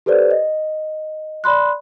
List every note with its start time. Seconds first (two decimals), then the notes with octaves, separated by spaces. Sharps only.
0.06 G4 A4 B4 C5 D5
0.31 D#5
1.44 D5 B5 C6 F#6